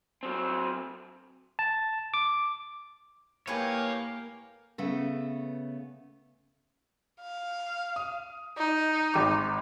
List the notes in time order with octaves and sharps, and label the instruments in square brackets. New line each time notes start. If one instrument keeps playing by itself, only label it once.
[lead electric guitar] F#3 C4
[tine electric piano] A5
D6
[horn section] A2 G4 F5 [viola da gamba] A#3 [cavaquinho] B4 G5 G#5 [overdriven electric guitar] C#5
[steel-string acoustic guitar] C#3 A3 B3
[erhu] F5
[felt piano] D#6
[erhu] D#4
[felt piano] G#1 D6